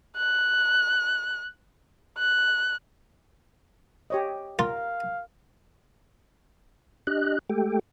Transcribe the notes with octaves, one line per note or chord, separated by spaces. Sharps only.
F#6
F#6
G4 C#5 D#5
F4 A#4 F5
D4 G4 D#5 F#6
G#3 A3 G4 A4 G5